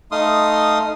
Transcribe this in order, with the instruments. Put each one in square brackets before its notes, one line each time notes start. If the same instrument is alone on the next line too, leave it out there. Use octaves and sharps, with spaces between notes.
[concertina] A3 D#4 F5 C6 D#6